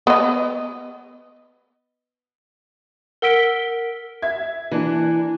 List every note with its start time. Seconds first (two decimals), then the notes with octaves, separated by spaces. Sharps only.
0.07 B3 D#5
3.22 A#4 F#5 E6 B6 D7 G7
4.22 E5 G#6
4.71 E3 A#3 D4